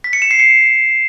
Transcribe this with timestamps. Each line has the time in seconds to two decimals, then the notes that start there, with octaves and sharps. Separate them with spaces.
0.04 B6
0.13 C#7
0.22 E7
0.31 C7
0.39 C#7